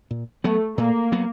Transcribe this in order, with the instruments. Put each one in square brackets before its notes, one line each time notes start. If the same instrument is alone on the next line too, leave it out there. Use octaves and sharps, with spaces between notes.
[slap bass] A#2
[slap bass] F#3 B3 [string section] A3
[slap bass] A#2 [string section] A#3
[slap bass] F#3 B3